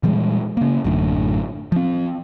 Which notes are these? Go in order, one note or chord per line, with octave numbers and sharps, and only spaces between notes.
A#2 E3 G3 G#3
C#3 A#3
A1 F#2 A2 D3
F3 C4